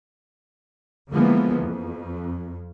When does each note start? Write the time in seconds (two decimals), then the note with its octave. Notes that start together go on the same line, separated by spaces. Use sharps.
1.11 D3 E3 F3 G#3 A#3 B3
1.63 F2